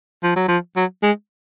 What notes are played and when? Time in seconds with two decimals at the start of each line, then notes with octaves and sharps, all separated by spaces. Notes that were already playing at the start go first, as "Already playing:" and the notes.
0.24 F3
0.36 F#3
0.48 F3
0.76 F#3
1.03 G#3